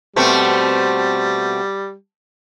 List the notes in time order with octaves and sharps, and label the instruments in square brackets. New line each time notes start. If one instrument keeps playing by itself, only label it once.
[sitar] B2 A3 C4 [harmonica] G3